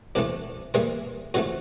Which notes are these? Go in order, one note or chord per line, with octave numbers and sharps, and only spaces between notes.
C2 C3 E3 A3 D4
G2 E3 G3 A#3 E4
F2 C3 E3 A3 F#4